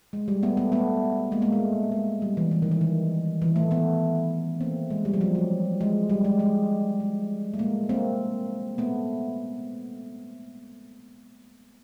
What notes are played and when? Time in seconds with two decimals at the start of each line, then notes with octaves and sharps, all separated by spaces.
0.13 G#3
0.28 G3
0.43 A3 B3
0.57 A3 B3
0.72 A3 B3
1.32 G#3 A#3
1.42 G#3 A#3
1.52 A3
1.92 G#3
2.22 G3
2.37 E3
2.51 E3
2.62 D#3
2.71 E3
2.81 D#3
3.42 E3
3.56 A3
3.71 A3 B3
4.61 A#3 C4
4.90 G#3
5.05 G3
5.14 F3
5.21 F#3
5.35 F#3
5.81 G#3
6.10 G3
6.24 G#3
6.39 G#3
7.00 G#3
7.54 A3
7.59 G#3 A#3
7.89 A#3 C4
8.78 A3 B3